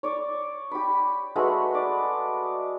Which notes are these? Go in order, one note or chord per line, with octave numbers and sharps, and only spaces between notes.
C#5 D5
G4 B5
G#3 A3 F#4 B4
D5